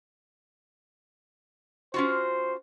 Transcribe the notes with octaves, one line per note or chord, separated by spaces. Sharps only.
C#4 F4 F#4 C5